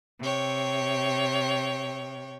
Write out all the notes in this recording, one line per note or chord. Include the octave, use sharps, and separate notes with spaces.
C3 C#5 G5